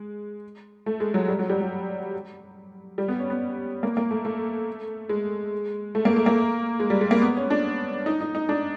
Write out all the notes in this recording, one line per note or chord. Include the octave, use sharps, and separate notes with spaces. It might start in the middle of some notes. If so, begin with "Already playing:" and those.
Already playing: G#3
A3
G#3
F#3
G3
F#3
G3
F#3
G3
B3
C#4
B3
A#3
A#3
A3
A3
G#3
A3
A#3
A3
A#3
G#3
G3
G#3
A#3
B3
C#4
D4
D#4
D#4
D#4
D4